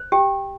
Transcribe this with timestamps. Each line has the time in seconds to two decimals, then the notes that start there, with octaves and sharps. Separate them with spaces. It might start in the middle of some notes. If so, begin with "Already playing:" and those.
Already playing: C5
0.12 G4 G5